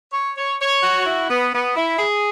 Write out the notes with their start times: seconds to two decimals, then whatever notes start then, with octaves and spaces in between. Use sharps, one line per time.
0.13 C#5
0.37 C#5
0.60 C#5
0.83 F#4
1.06 E4
1.29 B3
1.53 B3
1.76 E4
1.99 G#4